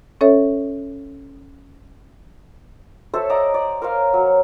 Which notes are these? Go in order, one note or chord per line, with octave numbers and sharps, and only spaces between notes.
C#4 A4 C#5 E5
A4 C5 C#5 E5
D5 D#5 F#5 A#5
D5
A#4 C5 C#5 F5
F#3